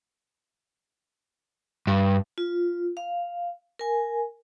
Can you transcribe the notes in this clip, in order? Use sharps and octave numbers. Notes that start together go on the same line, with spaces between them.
G2
F4
F5
A#4 G#5